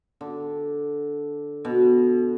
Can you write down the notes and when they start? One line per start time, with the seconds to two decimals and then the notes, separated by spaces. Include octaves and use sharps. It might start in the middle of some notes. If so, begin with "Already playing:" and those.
0.21 D3
1.65 B2